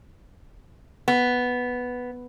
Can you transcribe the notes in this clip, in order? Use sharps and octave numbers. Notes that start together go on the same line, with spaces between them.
B3